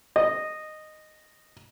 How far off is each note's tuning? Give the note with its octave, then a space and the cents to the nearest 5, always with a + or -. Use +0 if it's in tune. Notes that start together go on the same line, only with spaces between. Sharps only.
D#5 -10